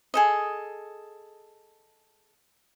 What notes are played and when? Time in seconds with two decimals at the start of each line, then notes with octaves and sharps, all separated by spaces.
0.14 G#4 A4 D#5